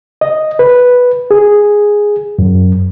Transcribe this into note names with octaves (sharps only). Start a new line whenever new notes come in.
D#5
B4
G#4
F#2